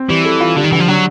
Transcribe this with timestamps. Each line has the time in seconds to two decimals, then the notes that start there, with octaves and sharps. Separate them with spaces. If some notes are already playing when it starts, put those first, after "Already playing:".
Already playing: C4
0.09 E3 G3
0.25 A4
0.40 F4
0.56 D3 G3
0.64 D#3
0.72 D3 E3
0.80 F3
0.88 D3 F#3